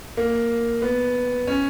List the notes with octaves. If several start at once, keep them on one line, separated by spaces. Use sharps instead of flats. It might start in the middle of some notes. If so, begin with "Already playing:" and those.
A#3
B3
C#4